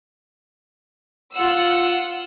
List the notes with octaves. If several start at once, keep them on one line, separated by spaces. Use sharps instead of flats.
F4 F#5 E6